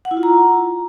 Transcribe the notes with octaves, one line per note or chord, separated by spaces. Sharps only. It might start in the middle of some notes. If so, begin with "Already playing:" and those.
F#5
E4
F4
A#5